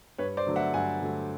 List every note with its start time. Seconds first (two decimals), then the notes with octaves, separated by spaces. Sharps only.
0.18 G2 B4 C#5
0.37 C5 D5
0.47 D3 F#3 A3
0.56 E5 F#5
0.74 G2 F#5 G#5
1.01 D3 F#3 A3